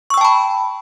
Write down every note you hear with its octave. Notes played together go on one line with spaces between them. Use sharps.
G5 A5 B5 C#6 E6